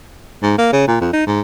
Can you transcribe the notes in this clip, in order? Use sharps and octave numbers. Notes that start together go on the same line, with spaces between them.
G#2
A#3
C#3
A#2
F2
D#4
G#2